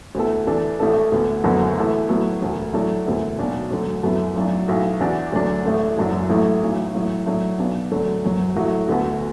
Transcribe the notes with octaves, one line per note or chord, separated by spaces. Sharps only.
D2 D3 B3 E4 A4
E2 E3 D4 A4
A1 A2 A3 D4 A4
D2 D3 B3
F#1 F#2 D3 B3 F#4
A2 E3 B3 E4 A4
A2 F#3 B3 F#4 A4
E1 D2 D3
A2 F#3 D4 A4
E1 D2 D3 B3 E4
B1 B2 F#3 D4 F#4
D2 D3 F#3
F#2 F#3 B3 E4 A4
B1 A2 F#3 D4
B1 A2 A3 F#4
E2 E3 B3 D4 F#4
D2 D3 F#3 D4
A1 A2 A3 D4
F#1 F#2 F#3 D4 F#4
A1 A2 F#3 A3
B1 A2 F#3
A1 A2 F#3
A2 F#3 D4 A4
B1 B2 B3 D4
D2 D3 F#3 D4 A4
F#1 F#2 F#3
A1 A2 F#3 A3 F#4
D2 D3 B3 F#4 A4